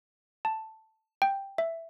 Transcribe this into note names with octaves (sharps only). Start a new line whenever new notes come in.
A5
G5
E5